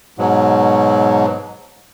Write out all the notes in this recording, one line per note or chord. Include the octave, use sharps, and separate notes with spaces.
G#2 B2 F#3